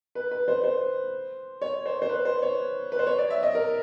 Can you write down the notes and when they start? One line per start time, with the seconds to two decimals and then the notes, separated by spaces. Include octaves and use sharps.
0.15 B4
0.31 B4
0.48 C5
0.64 C5
1.62 C#5
1.86 C5
2.02 C5
2.09 B4
2.25 C5
2.42 C#5
2.92 B4
2.99 C5
3.07 C#5
3.19 D5
3.30 E5
3.43 D#5
3.55 A#4